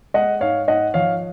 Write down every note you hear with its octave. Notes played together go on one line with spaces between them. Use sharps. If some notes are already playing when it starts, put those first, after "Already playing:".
G#3 D#5 F#5
G#2 C#5 F5
G#2 D#5 F#5
F3 C#5 F5